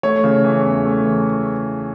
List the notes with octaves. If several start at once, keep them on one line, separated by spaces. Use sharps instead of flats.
A3 C#5
C#3
E3
E2
A3
E3